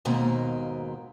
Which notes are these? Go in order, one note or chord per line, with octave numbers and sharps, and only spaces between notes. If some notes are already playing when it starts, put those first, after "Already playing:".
D#2 G#2 B2 A#3 C4